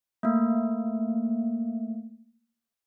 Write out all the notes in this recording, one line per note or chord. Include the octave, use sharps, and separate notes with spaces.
A3 A#3